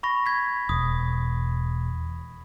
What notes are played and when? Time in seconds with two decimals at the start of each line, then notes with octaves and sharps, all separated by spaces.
0.03 B5 C#6 A#6
0.26 G#6 B6
0.69 E1 D#6